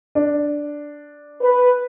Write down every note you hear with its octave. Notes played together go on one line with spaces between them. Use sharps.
D4
B4